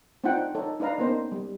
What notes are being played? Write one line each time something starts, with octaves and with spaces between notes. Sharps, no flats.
C4 D4 D#4 F4 F#5 G5
D#4 A4 C#5
D4 D#4 B4 F5 A#5
A#3 B3 C#4 D#4 C5
G3